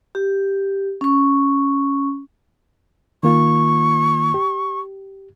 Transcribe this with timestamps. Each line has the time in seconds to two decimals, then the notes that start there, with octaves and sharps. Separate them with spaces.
0.15 G4
1.01 C#4 C#6
3.23 D#3 A#3 F4 C#6
4.34 G4